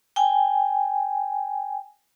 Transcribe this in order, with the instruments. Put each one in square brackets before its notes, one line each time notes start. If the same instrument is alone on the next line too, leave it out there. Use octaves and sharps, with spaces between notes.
[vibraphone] G5 G#5